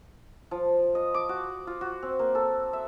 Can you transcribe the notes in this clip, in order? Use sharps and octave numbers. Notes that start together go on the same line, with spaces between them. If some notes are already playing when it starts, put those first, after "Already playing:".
F3
D#5
D6
F#4
F4
F#4
C4
A#3
A4
E5